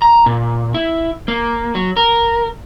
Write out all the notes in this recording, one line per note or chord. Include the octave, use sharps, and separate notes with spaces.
A#5
A#2
E4
A#3
F#3
A#4